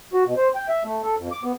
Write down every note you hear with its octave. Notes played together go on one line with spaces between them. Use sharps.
F#4
B2
C5
G5
E5
A3
A4
F2
D6
B3